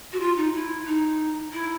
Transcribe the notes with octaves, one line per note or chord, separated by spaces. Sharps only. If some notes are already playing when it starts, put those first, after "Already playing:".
F#4
F4
D#4
E4
D#4
E4